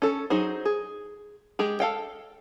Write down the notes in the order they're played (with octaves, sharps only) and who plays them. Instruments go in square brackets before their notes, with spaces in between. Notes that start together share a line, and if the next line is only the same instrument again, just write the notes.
[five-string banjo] C#4 A4
F#3 D#4 G#4 C5
G#4
G#3 G4 G#4
A4 F5 G5